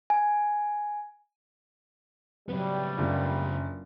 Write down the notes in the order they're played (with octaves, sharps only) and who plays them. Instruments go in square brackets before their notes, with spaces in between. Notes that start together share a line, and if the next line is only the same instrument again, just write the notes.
[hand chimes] G#5
[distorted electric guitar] C#3 B3 [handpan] F#3 C4 B4 [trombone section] G3
[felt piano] F#1 [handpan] A#3 D4 F4